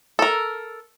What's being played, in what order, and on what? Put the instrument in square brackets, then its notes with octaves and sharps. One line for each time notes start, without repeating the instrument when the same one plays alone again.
[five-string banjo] A4 A#4